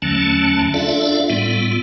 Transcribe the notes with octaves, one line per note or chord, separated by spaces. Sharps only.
E2 D3 F#3 A3 C#4 A5
D4 F4 A4 D5 E5 F5
A2 G3 B3 F4